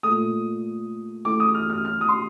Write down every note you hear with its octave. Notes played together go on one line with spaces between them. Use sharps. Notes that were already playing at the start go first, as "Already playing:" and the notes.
A#2 A3 D#6
A2 A3 D6
D#6
F6
F6
F6
D#6
C6